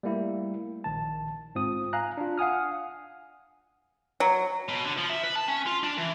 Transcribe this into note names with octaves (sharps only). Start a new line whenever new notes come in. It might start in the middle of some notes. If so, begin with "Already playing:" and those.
G3 A3 A#3 E4
A#1 D#3 A5
G#2 C4 F4 D#6
F5 G#5 A#5 F#6
D4 F4
F5 F#5 G#5 D#6 F6
F#3
B2
D3
F3
E5
B4
A5
C#4
F4
D4
E3